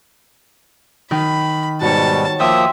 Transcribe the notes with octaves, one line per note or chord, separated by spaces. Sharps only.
D#3 B5
G#2 B2 G3 F#4 C#5 A5
F3 A#3 E5 G5 C6 D#6 E6